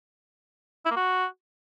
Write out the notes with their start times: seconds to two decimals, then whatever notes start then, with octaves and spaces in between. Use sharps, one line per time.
0.85 E4
0.91 A#3
0.96 F#4